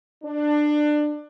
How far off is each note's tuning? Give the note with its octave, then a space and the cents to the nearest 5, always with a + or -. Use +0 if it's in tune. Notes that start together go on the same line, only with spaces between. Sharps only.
D4 +20